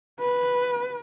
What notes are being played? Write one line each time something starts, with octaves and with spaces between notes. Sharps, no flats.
B4